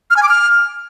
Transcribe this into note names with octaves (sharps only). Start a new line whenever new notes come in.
F6
G#5
D6
F6